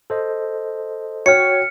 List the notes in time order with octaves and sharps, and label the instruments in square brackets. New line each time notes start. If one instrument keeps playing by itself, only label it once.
[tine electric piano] A4 C5 D#5
[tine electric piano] F#4 G5 [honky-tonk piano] C#5 [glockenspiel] F6 C#7